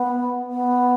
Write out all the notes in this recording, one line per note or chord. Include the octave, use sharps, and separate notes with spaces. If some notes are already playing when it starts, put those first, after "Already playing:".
Already playing: B3
B3